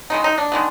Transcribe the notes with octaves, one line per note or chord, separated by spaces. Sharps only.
D#3 G#3 B3 D#4
D#4
D4
D#3 G#3 B3